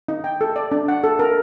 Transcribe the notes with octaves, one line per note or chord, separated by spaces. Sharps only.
D#4
G5
A4
D5
D4
F#5
A4
A#4